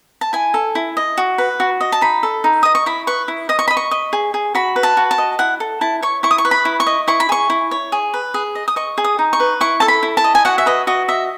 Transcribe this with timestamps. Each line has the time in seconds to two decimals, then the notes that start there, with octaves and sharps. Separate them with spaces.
0.21 A5
0.33 E4 G#5
0.54 A4
0.75 E4
0.97 D#5
1.17 F#4
1.38 B4
1.60 F#4
1.81 D#5
1.92 A5
2.01 D#4 B5
2.23 A4
2.44 D#4
2.63 D#5 D#6
2.75 C#6
2.86 E4 B5
3.07 B4 C#6
3.28 E4
3.49 D#5 D#6
3.59 C#6
3.68 D#5 B5
3.77 C#6
3.91 D#5
4.13 G#4
4.34 G#4
4.55 F#4 B5
4.76 B4
4.83 A5
4.97 F#4
5.11 A5
5.18 D#5
5.39 E4 F#5
5.60 A4
5.81 E4 A5
6.02 C#5 C#6
6.23 E4 C#6
6.31 D#6
6.38 C#6
6.45 B4
6.51 B5
6.65 E4
6.80 C#6
6.87 D#5
7.08 E4 C#6
7.20 B5
7.29 G#4 C#6
7.50 E4
7.71 C#5
7.92 G#4
8.14 B4
8.34 G#4
8.55 D#5
8.68 D#6
8.76 D#5 C#6
8.98 G#4
9.04 D#6
9.19 D#4
9.33 C#6
9.40 B4
9.61 E4 C#6
9.80 A4 A5
9.88 B5
10.03 E4
10.17 A5
10.24 D#5
10.35 G#5
10.45 F#4 F#5
10.58 E5
10.66 B4 D#5
10.87 F#4 D#5
11.08 D#5 E5